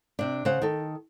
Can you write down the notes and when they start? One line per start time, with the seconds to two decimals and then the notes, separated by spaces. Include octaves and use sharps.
0.19 C3 D4
0.45 C#3 C5 F#5
0.62 D#3 A4